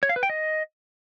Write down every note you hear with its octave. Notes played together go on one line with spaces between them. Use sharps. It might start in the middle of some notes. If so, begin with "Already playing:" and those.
C#5
F5
B4
G5
D#5